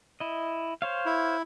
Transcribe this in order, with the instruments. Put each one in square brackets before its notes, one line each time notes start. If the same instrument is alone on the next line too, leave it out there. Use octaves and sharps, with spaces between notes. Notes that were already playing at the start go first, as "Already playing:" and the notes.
[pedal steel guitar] E4 D#5
C5 C#5 F5
[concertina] E4